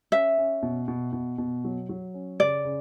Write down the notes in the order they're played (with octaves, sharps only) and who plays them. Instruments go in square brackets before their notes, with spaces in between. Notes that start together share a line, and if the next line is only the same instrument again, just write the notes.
[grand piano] C#4 [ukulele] E5
[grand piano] C#4
B2
B2
B2
B2
F#3
F#3
C#4
[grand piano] C#3 [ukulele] D5
[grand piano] C#3